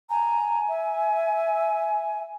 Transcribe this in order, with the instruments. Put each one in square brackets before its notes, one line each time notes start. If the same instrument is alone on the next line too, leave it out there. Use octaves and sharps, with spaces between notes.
[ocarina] G#5 [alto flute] A#5
[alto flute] E5